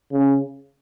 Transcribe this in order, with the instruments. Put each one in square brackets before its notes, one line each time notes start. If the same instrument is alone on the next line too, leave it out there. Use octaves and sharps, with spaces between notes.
[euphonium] C#3